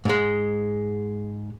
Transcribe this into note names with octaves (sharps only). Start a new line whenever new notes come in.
G#2 G#3